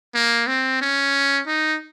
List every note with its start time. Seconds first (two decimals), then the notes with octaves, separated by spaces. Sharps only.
0.14 A#3
0.47 C4
0.81 C#4
1.47 D#4